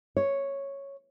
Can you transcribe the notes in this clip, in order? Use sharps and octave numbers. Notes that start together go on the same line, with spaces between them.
C#5